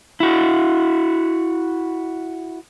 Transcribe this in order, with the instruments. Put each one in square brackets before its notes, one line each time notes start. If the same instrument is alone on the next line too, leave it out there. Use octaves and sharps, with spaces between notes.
[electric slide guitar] E4 F#4